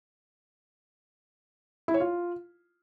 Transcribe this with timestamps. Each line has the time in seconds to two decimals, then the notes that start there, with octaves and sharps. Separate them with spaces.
1.88 E4
1.94 C#5
2.00 F4